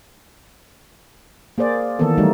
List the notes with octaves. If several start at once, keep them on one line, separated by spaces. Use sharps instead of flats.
A#3 G#4 C5 D5
D#3 E3 A#3 B3 A4
E3 F#3 G3 A3 D#4 F#4